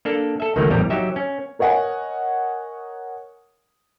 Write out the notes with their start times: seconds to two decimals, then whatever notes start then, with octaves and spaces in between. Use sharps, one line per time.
0.05 A#3 D4 A4
0.40 A4 E5
0.56 C#2 D#3 F#3 A3 A#3
0.70 A#1 E2 A2 G3 G4 A#5
0.90 F#3 D#4 G4 E5
1.16 C#4
1.59 A#4 C#5 D#5 F#5 G#5